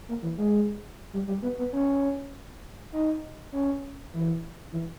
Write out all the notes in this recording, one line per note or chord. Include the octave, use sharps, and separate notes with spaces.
A#3
E3
G#3
G3
G3
B3
B3
C#4
D#4
C#4
E3
E3